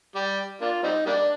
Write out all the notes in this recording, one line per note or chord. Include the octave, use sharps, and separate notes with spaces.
G3
A#3 D4 F4
G3 C4 D#4
G3 A#3 D4